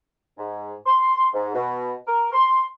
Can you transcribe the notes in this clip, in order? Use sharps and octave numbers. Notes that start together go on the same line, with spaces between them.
G#2
C6
G#2
B2
A#4
C6